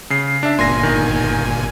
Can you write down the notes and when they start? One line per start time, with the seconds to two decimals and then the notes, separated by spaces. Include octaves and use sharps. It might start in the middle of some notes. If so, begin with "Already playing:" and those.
0.10 C#3 C7
0.43 D4 E5
0.59 G1 A#2 G#5 C6 A#6
0.83 D#3